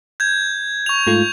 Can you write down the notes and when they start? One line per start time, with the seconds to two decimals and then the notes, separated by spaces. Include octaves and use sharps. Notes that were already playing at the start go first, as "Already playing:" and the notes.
0.20 G6 G#6
0.86 C#6 F7
1.07 G#2 A3 F4